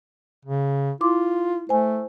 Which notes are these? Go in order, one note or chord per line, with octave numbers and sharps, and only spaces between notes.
C#3
E4 F4 C6 D6
A3 C5 G#5